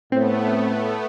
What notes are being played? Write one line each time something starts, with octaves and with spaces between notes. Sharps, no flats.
A2 A3 B3 C4 C5